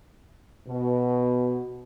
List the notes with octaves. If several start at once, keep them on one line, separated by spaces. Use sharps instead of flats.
B2